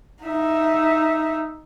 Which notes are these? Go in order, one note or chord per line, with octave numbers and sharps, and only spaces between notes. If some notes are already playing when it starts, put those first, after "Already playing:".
D#4 E5